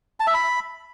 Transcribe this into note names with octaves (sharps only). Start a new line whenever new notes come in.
A5
E5
B5